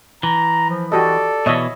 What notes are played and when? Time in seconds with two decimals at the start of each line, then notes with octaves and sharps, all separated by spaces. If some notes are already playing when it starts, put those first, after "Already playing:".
0.23 E3 A#5
0.69 F3
0.92 F#4 G4 A4 D5 D#5
1.46 B2 E3 C#5 D#5 E5